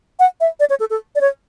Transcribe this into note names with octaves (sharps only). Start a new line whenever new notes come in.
F#5
E5
D5
C#5
A4
A4
D5
C#5